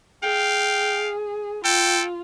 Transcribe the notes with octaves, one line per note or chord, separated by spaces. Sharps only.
G#4 F5 G5
F4 A4 G5